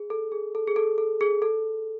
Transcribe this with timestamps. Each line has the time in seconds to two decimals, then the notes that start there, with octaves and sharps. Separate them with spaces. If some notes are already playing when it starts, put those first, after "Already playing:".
Already playing: G#4
0.10 A4
0.32 G#4
0.55 A4
0.67 G#4
0.76 A4
0.98 A4
1.21 G#4
1.42 A4